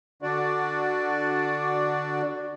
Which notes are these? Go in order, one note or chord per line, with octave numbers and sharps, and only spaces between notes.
D3 D4 F#4 D5